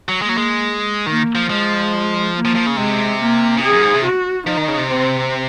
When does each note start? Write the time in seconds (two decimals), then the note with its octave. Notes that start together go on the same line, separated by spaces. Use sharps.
0.09 F#3
0.22 G#3 A#3
0.29 F#3
0.37 G#3
1.06 D#3 A#3
1.35 F3
1.49 F3 G#3
2.35 A#3
2.45 F3
2.55 F3
2.66 C#3
2.77 C3 G#3
3.19 A#3
3.57 C#3
3.61 C3 G#4
3.72 F#2
3.83 G#2
3.94 C3
4.04 F#4
4.46 F3 D#4
4.57 D#3
4.68 C#3
4.78 C3
4.89 C4